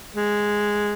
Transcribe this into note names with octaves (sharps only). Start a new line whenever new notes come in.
G#3